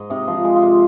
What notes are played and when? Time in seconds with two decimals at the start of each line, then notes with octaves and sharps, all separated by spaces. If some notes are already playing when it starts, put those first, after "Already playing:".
Already playing: G#2 D#5
0.10 C3 D#4
0.28 F3
0.34 D#4
0.44 G#3
0.56 F4
0.62 C3